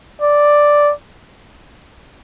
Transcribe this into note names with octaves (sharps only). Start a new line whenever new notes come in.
D5